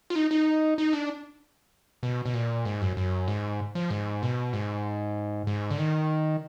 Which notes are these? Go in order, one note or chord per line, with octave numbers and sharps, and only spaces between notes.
F4
D#4
D#4
D#4
D4
B2
B2
A#2
G#2
F#2
F#2
G#2
F3
G#2
B2
G#2
G#2
D3
D#3